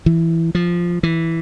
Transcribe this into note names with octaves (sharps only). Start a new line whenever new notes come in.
E3
F3
E3